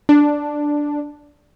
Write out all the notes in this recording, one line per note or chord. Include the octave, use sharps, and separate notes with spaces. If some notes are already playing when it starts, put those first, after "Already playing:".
D4